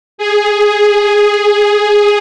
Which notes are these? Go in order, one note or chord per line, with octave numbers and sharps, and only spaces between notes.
G#4